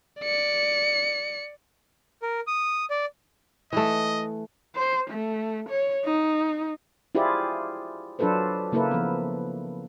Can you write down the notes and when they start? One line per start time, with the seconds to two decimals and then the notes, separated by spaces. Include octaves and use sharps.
0.21 D5 C#7
2.22 A#4
2.47 D#6
2.90 D5
3.73 E3 A3 D#5
4.75 C5
5.10 A3
5.69 C#5
6.05 D#4
7.15 E4 F4 G4 G#4 C5 D5
8.19 F#3 D4 F4 A4 B4 C5
8.72 C#3 A#3 E4 A4 B4
8.91 F3 B3